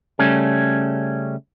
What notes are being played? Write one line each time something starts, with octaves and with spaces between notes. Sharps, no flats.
C#3 G3 A3 C#4